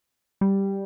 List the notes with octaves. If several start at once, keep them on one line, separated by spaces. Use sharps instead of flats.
G3